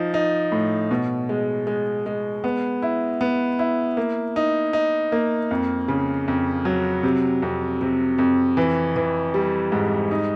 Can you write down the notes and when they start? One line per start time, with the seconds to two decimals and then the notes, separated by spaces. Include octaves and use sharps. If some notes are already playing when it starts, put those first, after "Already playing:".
Already playing: F3 D#4
0.14 D#4
0.52 A2
0.91 B2
1.29 G#3
1.67 G#3
2.06 G#3
2.44 B3
2.82 E4
3.21 B3
3.59 E4
3.97 A#3
4.36 D#4
4.73 D#4
5.12 A#3
5.51 F2
5.88 C#3
6.28 F2
6.65 F#3
7.03 C3
7.42 F2
7.81 C3
8.18 F2
8.57 E3
8.96 E3
9.34 G3
9.72 G#2
10.11 D#4